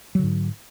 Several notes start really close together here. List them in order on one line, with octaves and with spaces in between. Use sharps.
F#3 D3 G#2